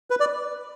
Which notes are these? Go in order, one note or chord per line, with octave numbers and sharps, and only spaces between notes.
B4
D5